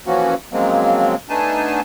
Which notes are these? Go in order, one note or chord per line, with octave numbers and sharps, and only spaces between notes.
E3 F3 A#3 C#4 F#4
C#3 F3 F#3 G#3 A#3 C4
A3 B3 D4 D#4 G#5 A5